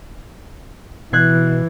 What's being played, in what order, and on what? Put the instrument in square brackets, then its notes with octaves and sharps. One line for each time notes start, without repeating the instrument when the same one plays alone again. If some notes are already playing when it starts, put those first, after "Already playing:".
[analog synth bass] B2 [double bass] E3 [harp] F#6 G#6 C7